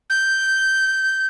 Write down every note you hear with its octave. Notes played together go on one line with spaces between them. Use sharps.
G6